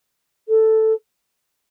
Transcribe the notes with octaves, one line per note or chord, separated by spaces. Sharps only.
A4